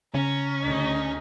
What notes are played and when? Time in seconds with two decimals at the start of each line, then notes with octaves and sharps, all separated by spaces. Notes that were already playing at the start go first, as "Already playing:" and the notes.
0.14 C#3 C#4 A#5
0.63 D2 D3 D#4 G#4